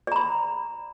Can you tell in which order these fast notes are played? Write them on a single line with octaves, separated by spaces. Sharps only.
D5 A#5 B5